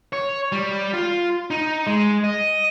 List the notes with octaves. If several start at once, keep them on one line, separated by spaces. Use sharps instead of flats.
C#5
G3
F4
D#4
G#3
D#5